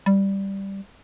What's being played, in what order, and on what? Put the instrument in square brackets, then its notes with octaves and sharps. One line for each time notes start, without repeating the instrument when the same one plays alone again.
[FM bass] G3